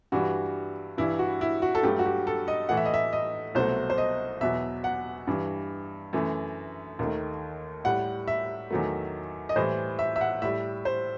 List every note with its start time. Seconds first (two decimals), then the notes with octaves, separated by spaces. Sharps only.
0.12 G2 E3 G3 F#4
0.98 G2 E3 G3 E4
1.19 F#4
1.41 E4
1.62 F#4
1.75 A4
1.83 G2 F#3 A3 G4
1.99 F#4
2.05 G4
2.27 A4
2.48 D#5
2.69 A2 E3 A3 F#5
2.77 E5
2.85 D#5
2.94 E5
3.13 D#5
3.55 C2 B2 F#3 A3 C5
3.90 C5
3.98 D#5
4.41 E2 B2 F#3 E5
4.84 F#5
5.27 G2 E3 G3
6.13 F#2 E3 A3
6.99 D#2 D#3 A3
7.84 A2 G3 F#5
8.28 E5
8.71 E2 D#3 F#3 A3
9.49 D#5
9.56 A2 E3 G3 C5
9.99 E5
10.16 E5
10.21 F#5
10.42 A2 G3 E5
10.85 C5